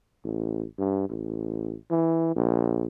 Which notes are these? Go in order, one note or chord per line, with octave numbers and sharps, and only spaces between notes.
A1
G2
A1
E3
A#1